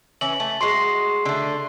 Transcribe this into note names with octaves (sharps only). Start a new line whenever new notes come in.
E3 C#4 F#7
A3
G#3 F#4 C6 C7
D3 A3